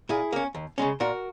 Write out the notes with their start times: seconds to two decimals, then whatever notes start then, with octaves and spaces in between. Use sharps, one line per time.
0.09 A#2 E4 G#4
0.33 A#3 C#4
0.55 D#2
0.78 C#3 G#3 C#4
1.00 A#2 F#4 A#4